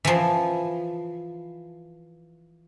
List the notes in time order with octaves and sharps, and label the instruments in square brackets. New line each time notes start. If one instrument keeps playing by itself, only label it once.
[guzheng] E3 F3